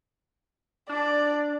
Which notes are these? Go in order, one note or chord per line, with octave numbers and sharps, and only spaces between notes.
D4 D5